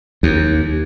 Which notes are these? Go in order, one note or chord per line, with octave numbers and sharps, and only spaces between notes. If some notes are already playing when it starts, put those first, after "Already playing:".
D#2